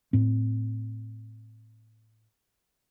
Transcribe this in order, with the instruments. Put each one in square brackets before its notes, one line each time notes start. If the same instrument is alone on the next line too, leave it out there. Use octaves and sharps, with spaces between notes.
[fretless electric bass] A2 C4